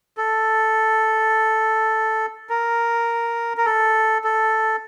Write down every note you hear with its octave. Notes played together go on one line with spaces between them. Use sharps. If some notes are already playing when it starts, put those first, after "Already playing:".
A4
A#4
A#4
A4
A4